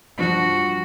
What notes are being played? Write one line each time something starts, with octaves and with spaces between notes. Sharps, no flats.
G2 F3 F#4